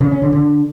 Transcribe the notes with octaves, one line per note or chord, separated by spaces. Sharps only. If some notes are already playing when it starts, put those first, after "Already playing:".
C#3
C#4
D3
D3